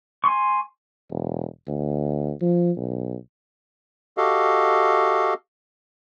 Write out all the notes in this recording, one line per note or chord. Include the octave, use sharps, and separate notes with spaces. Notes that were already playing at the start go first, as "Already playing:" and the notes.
G#5 C6 C#6
E1
D2
F3
B1
F#4 G4 A4 D#5 F5